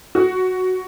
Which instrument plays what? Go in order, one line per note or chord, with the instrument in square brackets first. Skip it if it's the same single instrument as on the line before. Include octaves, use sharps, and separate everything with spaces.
[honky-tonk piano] F#4